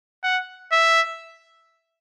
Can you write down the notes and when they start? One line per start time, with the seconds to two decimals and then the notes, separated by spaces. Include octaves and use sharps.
0.24 F#5
0.72 E5